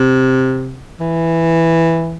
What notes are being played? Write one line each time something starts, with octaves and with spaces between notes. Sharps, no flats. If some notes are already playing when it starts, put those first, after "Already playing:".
Already playing: C3
E3